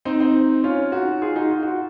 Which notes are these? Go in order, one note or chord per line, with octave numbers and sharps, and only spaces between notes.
C4 D#4
C4 D#4
C#4 F4
D#4 F#4
F4 G#4
D#4 F#4
F4
F#4